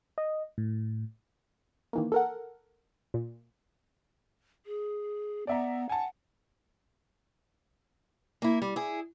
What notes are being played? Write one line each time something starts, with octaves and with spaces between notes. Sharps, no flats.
D#5
A2
D#3 E3 A#3
A4 A#4 F#5
A#2
G#4
B3 D5 E5 A#5
F#5 G#5 A5
A#3 E4
G3
E4 G#4